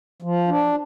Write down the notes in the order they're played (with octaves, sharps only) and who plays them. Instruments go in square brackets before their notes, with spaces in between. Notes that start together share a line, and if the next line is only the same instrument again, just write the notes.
[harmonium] F3
D4